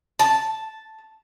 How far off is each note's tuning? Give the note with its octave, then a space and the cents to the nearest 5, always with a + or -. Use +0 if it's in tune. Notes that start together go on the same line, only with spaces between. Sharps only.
A5 +0